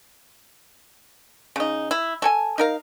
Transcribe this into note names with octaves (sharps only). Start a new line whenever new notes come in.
C#3 D#4
E4
A3 A4 G#5
D#4 A#4 F5